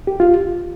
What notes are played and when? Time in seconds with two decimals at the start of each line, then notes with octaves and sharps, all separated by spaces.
0.07 G4
0.20 F4